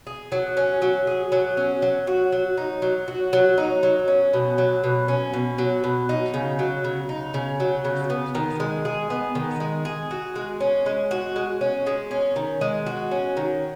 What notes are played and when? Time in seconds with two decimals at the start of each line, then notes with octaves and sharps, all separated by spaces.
0.07 G#4
0.32 F#3
0.57 C#4
0.82 F#3
1.07 G#4
1.32 F#3
1.57 C#4
1.82 F#3
2.07 F#4
2.32 F#3
2.57 D#4
2.82 F#3
3.08 F#4
3.33 F#3
3.58 D#4
3.83 F#3
4.08 C#4
4.33 B2
4.58 F#3
4.84 B2
5.08 C#4
5.34 B2
5.58 F#3
5.84 B2
6.09 D#4
6.34 C#3
6.59 F#3
6.84 C#3
7.09 D#4
7.34 C#3
7.60 F#3
7.85 C#3
8.10 B3
8.35 D#3
8.60 G#3
8.85 G#4
9.10 B3
9.35 D#3
9.60 G#3
9.85 G#4
10.11 F#4
10.36 G#3
10.61 C#4
10.86 G#3
11.11 F#4
11.36 G#3
11.61 C#4
11.87 G#3
12.11 C#4
12.36 D#3
12.61 G#3
12.86 F#4
13.11 C#4
13.37 D#3